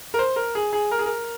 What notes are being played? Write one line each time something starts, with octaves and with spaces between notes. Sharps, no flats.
A#4
C5
A#4
G#4
G#4
A#4
G#4
A#4